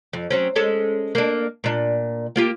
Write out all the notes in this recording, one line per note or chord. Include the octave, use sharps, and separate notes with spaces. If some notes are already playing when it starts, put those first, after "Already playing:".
F2
F#3 C4 C#4
G#3 C#4 A4
A#3 D4
A#2 D4
A#3 F4 G4